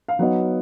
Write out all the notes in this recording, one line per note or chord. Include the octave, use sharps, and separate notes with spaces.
F5
F#3 B3 D#4 F#5